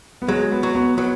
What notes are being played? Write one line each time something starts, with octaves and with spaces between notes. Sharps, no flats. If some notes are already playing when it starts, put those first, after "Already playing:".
B3
F#3 G#3
B3
F#3
B3
F#3 B3